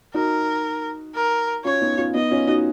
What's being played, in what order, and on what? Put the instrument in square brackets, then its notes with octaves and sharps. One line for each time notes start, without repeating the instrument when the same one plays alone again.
[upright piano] D#4 F#4 [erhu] A#4
[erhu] A#4
[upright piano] C#4 F4 [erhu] C#5
[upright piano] B3 D#4
C#4 F4
[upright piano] B3 D#4 [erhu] D#5
[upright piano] C#4 F4
D#4 F#4